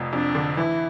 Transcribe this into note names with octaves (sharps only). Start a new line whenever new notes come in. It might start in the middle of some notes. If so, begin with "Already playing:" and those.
Already playing: F1 F2
F2 D4
D3
E3 E4